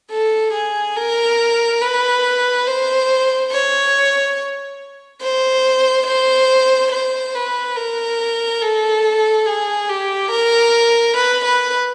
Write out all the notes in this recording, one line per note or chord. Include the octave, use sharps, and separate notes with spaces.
A4
G#4
A#4
B4
C5
C#5
C5
C5
C5
B4
A#4
A4
G#4
G4
A#4
B4
B4